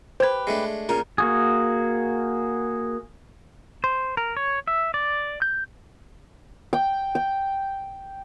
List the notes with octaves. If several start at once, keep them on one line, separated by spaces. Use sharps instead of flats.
G4 B4 C5 G#6
G#3 A3 D4
A#2 C#3 A#4
A#3 F#4 G#4
C5
A#4
C#5
E5
D5
G6
G5
G5